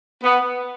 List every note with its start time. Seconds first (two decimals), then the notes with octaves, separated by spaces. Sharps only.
0.23 B3